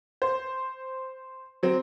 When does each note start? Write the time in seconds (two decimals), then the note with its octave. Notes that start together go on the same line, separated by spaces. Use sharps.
0.22 C5
1.63 F#3 C4